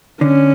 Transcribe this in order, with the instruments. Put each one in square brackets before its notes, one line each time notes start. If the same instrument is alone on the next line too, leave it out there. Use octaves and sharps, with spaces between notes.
[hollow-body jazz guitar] D3 [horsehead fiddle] C#4